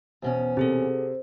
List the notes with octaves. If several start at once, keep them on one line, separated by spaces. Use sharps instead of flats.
E2 B2 C#4 C5
C3 C4 G#4 A4